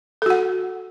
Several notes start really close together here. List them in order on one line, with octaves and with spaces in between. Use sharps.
A4 F#4 F#5